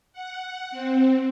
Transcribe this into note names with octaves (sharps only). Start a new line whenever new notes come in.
F#5
C4